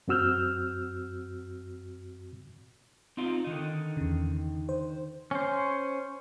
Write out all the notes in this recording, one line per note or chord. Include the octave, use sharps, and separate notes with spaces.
F#2 C4 F#4 E6 F6 G6
C4 D#4 F4
D3 D#3 D#4
E2 C#3
C5
C#4 C5